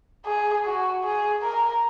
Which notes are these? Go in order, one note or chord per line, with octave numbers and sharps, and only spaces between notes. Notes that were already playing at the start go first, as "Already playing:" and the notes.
G#4
F#4
G#4
A#4